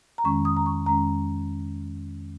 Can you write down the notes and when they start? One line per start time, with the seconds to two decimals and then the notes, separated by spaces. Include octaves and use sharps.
0.18 A#5
0.24 F2 D#3 G#3 C#4 C#6
0.45 D#6
0.57 A#5
0.66 C#6
0.86 F2 D#3 G#3 C#4 A#5